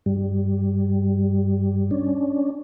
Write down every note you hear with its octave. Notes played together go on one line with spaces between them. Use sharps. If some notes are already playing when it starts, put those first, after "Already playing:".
G2 G3
C#4 D4